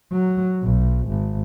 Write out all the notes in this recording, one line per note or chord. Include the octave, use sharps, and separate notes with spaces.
F#3
B1
G#1